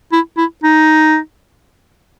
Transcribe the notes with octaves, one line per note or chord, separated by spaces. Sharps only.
E4
E4
D#4